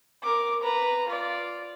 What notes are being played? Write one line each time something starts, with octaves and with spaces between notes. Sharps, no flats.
A#4 D6
B4 A#5
F4 D5